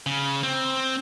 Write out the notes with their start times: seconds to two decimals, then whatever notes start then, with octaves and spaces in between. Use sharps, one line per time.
0.06 C#3
0.43 C4